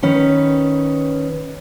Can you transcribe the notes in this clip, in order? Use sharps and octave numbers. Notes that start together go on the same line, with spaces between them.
D#3 C#4 B4